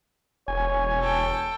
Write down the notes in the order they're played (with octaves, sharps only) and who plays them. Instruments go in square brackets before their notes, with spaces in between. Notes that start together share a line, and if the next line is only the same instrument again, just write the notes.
[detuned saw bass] E1 [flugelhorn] C#5 [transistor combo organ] G#5
[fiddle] A4 G5